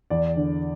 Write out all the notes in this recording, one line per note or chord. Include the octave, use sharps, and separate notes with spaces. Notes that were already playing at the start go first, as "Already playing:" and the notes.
E2 D5
D3